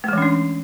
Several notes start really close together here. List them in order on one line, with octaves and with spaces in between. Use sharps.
A3 G#3 E3 C#4 D4